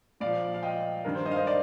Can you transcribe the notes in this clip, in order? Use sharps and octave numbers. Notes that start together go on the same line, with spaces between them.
A#2 F3 D5 F5
F5
D#5 G5
G2 D#3 A#4
C5
C5 D#5
F5
C5 D#5
D5 F5